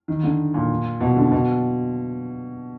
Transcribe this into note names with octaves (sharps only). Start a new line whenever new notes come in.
D#3
D3
A#2
B2
D3
B2